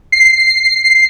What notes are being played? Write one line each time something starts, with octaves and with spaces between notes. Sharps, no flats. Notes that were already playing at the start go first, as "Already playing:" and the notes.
C7